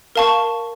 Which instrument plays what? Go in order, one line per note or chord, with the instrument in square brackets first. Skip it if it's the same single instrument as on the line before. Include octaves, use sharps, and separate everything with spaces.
[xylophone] A#4 F5 A5 C#6